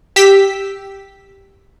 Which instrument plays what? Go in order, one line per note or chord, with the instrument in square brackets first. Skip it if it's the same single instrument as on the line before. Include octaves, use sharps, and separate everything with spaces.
[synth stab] G4 E6 B6